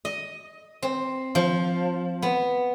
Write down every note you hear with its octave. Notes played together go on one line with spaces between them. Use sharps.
D#5
C4
F3
B3